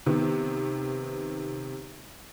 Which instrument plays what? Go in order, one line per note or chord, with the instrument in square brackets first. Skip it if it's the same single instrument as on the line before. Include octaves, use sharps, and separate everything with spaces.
[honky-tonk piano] C3 D#3 B3